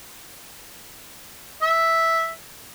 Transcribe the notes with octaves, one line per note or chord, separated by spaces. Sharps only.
E5